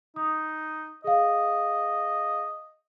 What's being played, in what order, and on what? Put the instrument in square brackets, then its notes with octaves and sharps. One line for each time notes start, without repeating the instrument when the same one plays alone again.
[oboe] D#4 [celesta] D#6
[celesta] G#4 F5 [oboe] D#5